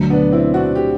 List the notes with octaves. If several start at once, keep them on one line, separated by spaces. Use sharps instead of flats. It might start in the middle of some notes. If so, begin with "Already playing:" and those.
Already playing: D2 D3 F#3
B3 D4
C4 E4
D4 F#4
G4